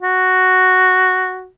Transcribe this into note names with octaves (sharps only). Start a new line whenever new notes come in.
F#4